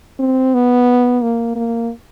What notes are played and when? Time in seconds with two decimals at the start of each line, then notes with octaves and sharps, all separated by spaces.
0.19 C4
0.54 B3
1.22 A#3
1.56 A#3